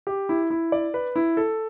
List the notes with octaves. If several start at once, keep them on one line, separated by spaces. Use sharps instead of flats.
G4
E4
E4
D5
B4
E4
A4